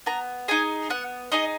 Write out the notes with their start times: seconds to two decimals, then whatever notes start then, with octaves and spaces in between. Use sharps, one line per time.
0.06 B3 A#5
0.48 D#4 G#4 G#5
0.90 B3 F#5
1.32 D#4 G#4 D#5